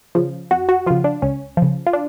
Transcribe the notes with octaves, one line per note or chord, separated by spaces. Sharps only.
C#3 F3
F2 F#4
F#4
C#3 F3 F4
D4
C#2 C#4
C#3 F3
F4
D4